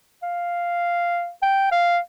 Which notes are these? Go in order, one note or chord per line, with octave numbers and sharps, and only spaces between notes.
F5
G5
F5